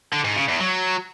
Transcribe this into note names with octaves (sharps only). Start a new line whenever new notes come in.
D3
G#2
C#3
E2
F#3